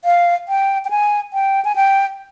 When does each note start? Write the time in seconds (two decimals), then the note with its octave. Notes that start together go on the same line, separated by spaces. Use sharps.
0.05 F5
0.48 G5
0.85 G5
0.90 G#5
1.33 G5
1.65 G#5
1.76 G5